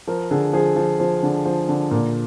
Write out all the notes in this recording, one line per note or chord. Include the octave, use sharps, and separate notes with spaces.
F3 A#4
D3 G#4
F3 G#4
F3
F3
D3
F3
D3
A#2